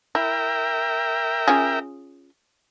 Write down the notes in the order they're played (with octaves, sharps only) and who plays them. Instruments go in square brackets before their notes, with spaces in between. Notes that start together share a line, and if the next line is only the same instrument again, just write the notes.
[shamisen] E4 [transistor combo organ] A#4 E5 G5
[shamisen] C#4 F4 G#4